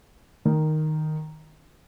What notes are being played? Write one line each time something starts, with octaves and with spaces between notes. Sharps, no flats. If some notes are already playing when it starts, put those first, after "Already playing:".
D#3